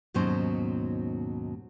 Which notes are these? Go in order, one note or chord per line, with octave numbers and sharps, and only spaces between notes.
D#2 G#2 B2 F#3 C#4 C5